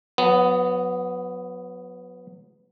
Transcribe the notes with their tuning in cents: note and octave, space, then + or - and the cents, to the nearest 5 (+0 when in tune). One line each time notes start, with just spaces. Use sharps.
F#3 -25 B3 +10